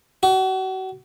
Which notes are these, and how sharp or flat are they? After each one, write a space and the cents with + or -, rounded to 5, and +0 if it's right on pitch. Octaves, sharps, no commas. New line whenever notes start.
F#4 +35